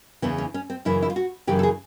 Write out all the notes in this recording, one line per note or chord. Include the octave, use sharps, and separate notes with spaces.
E2 C#3 E3 B3
C#4
C#4
C4
F#2 C#3 E3 E4
E4
F4
F#4
F#2 C#3 E3 G4
A4
G#4